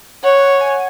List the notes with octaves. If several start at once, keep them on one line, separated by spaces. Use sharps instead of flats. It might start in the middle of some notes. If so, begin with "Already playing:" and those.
C#5 F#5
G#5